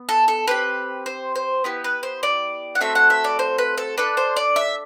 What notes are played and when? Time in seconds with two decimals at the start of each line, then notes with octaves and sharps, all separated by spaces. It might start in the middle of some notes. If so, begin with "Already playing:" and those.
Already playing: B3
0.09 A4
0.28 A4
0.47 C4 G4 B4
1.06 C5
1.35 C5
1.64 B3 E4 G4 B4
1.84 B4
2.03 C5
2.23 D5
2.75 F#5
2.81 A3 C4 F#4 A4 E5
2.95 F#5
3.10 E5
3.24 D5
3.39 C5
3.58 B4
3.78 A4
3.98 D4 A4 B4
4.17 C5
4.37 D5
4.56 E5